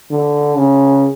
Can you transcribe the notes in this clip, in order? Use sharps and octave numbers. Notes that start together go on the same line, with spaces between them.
D3
C#3